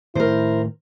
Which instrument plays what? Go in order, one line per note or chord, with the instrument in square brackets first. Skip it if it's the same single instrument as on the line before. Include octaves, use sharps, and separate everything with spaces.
[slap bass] A2 D#3 A3 [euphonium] E4 [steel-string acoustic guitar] A#4 C5